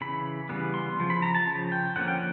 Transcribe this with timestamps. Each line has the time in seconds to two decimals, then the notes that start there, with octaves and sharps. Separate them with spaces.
0.01 C#3 E3 B5
0.49 C#3 E3 G3 B3
0.74 C6
1.00 C#3 F3
1.10 B5
1.22 A#5
1.35 A5
1.47 C#3 F3
1.72 G5
1.96 D3 F3 A#3 C#4 F#5
2.08 G5